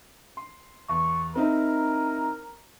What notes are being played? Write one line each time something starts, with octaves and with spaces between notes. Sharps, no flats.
C6
E2 C#6
C4 D#4 E4 A#4